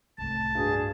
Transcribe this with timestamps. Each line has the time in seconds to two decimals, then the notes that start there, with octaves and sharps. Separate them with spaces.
0.18 C2 A2 A5
0.55 G2 D4 F#4 G#4